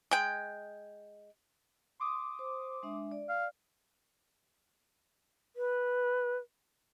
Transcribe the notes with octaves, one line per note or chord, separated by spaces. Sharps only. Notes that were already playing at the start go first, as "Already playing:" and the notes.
G#3 G5
C6 D6 D#6
C5
G#3 D4 E5
D5
F5
B4